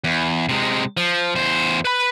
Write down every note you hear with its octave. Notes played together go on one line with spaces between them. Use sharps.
E2
C3 G#3
F3
E2 C5
B4 B5